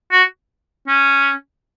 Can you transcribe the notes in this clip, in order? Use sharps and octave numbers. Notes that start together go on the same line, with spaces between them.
F#4
C#4